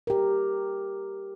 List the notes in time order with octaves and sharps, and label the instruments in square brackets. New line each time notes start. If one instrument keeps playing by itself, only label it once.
[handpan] G4 A#4